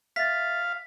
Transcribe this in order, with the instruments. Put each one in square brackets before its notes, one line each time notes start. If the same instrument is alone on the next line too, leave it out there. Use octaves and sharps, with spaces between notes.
[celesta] E5 A6 [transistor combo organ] F5 [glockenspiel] B6